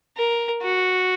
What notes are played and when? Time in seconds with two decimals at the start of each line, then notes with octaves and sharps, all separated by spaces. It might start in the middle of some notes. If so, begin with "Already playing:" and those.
0.17 A#4
0.62 F#4